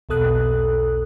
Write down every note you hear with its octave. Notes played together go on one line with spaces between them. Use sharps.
B1 E2 B2 A4 D#6 F#6